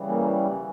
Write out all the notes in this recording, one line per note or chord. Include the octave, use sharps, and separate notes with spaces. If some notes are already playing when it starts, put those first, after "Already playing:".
Already playing: C#3 E3 G3
A#3